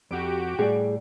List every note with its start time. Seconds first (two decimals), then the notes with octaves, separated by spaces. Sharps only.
0.11 F2 F#4 G4 D7
0.59 A2 G3 G#4